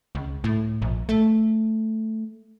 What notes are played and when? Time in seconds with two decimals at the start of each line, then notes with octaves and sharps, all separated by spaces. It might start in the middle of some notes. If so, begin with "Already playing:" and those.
0.15 C#2
0.44 A2
0.82 A#1
1.09 A3